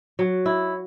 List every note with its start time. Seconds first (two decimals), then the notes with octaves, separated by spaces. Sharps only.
0.19 F#3
0.46 E4